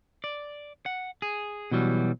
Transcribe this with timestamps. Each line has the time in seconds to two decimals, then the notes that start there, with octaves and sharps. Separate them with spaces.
0.24 D5
0.86 F#5
1.22 G#4
1.71 B2 E3 F#3 G3